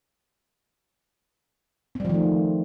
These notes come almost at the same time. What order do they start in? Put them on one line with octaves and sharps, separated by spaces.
C4 G3 F3 D#3 A3